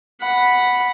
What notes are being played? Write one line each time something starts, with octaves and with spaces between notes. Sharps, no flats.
F#5 B5